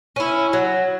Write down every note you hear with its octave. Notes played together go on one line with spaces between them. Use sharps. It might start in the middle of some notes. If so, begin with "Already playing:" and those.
C#4 E4
F#3